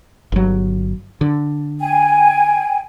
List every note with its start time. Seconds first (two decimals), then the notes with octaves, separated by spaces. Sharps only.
0.32 G1 F#3
1.21 D3
1.80 G5 G#5